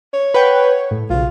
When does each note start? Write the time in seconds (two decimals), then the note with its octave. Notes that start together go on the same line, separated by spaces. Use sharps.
0.14 C#5
0.34 B4 F#5 G5
0.91 A2
1.10 B1 C#3 F4